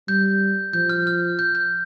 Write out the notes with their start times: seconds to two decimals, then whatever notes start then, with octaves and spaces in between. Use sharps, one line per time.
0.08 G3 G6
0.73 F3 G6
0.89 F6
1.07 F6
1.39 G6
1.55 G6